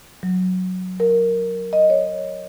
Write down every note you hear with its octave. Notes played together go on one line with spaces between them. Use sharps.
F#3
A#4
D#5
C#5